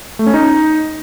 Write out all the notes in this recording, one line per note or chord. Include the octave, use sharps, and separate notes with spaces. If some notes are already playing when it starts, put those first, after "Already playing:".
A3
C#4
D#4